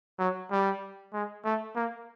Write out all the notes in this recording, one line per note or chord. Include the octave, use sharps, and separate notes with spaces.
F#3
G3
G#3
A3
A#3